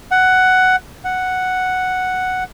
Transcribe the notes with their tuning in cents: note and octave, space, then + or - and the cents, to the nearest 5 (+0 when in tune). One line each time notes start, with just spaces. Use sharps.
F#5 +10
F#5 +0